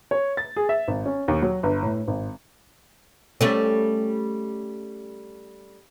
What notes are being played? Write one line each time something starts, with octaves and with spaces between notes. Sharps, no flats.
C#5
A6
G#4
E5
G#1
C#4
D#2
F#3
G1
A2
G#1
G3 A3 C#4